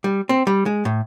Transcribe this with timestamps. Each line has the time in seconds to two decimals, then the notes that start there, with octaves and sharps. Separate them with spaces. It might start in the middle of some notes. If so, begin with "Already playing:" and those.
0.04 G3
0.29 C4
0.47 G3
0.66 G#3
0.85 A2